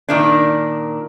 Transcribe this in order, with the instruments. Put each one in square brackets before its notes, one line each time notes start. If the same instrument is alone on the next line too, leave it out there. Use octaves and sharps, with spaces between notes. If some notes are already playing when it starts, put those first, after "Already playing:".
[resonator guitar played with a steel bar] A#2 D#3 D4